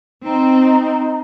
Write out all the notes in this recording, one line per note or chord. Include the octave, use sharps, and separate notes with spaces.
C4 D#4